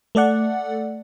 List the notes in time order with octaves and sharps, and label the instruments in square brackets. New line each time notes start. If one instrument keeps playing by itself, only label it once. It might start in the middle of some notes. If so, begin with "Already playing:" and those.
[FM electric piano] A3 A4 D5 F#5